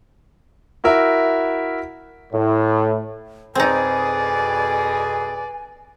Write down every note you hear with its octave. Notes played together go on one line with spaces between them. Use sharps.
E4 F#4 A#4 E5
A2
F2 B2 C4 D#4 G#4 B4 D5 G#5